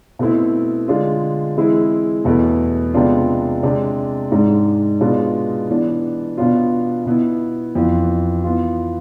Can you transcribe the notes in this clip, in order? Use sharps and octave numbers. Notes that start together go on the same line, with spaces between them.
B2 A3 C4 E4
D3 G#3 D4 F4
E3 G#3 C4 E4
E2 B2 A3 E4
C3 G#3 B3 D4 F4
C3 G#3 D4
G#2 G#3 D4
B2 G#3 D4 F4
E3 B3 D4
B2 B3 D4 F4
B2 B3 E4
F2 E3 B3 F4
E3 B3 F4